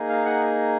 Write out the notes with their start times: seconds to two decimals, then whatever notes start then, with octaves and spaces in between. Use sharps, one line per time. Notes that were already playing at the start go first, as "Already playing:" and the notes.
Already playing: A#3 D#4 G#4
0.09 F5
0.25 F#5